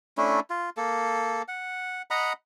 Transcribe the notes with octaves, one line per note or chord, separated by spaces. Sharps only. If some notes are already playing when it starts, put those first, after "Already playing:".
A3 C#4 D4 E4
F4
A#3 A4
F#5
D#5 F#5 A#5 B5